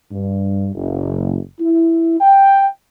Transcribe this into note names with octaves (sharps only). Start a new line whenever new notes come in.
G2
F#1
E4
G5